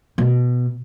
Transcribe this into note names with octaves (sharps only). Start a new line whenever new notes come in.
B2